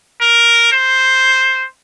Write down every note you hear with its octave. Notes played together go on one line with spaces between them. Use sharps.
A#4
C5